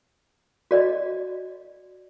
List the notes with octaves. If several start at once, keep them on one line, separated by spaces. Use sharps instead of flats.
F#4 D5 D#5